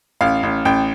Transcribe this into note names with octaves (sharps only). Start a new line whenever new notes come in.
A1 F5
A1
A1 G5